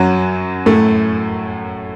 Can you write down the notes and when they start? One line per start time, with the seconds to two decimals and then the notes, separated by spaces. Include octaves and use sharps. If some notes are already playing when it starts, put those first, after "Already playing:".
Already playing: F#2 F#3
0.66 A2 A3